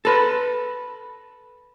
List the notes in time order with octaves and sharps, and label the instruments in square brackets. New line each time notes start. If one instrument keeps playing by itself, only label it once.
[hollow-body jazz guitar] A4 B4